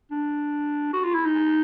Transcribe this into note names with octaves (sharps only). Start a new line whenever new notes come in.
D4
F#4
F4
E4
D#4